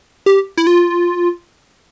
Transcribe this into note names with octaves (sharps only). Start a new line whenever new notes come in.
G4
E4
F4